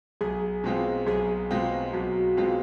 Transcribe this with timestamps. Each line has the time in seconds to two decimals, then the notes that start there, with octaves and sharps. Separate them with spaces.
0.21 B1 G#4
0.64 B2 G#3 C4 F4
1.07 B1 G#4
1.51 B2 G#3 C4 F4
1.94 B1 F#4
2.37 B2 G#3 C4 F4